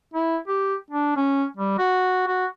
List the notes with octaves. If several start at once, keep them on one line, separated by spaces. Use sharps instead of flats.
E4
G4
D4
C#4
G3
F#4
F#4